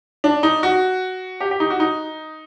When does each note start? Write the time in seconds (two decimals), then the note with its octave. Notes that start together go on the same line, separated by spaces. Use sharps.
0.24 D4
0.43 D#4
0.63 F#4
1.40 G4
1.51 G4
1.60 D#4
1.70 F#4
1.80 D#4